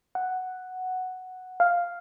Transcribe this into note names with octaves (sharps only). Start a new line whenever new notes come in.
F#5
F5